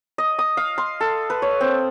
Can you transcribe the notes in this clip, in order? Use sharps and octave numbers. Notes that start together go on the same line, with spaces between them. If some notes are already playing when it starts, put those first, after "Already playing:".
D#5
D#6
F5
C6
A4
B4
C#5
C4